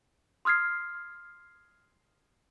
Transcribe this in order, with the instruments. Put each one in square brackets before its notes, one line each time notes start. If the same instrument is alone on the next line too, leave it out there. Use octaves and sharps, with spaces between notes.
[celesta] C6 D#6 F6 G#6 C7